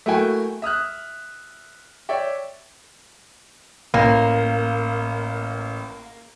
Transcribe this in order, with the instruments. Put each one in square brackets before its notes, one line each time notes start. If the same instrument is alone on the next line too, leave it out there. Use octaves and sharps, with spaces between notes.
[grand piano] A3 A#3 E4 F#4 G5 G#5
E5 D#6 F6 F#6
C#5 D5 E5 G5
[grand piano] A1 [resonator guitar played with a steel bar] A#3